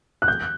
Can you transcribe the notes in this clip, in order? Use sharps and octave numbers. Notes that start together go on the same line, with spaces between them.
F#6
G6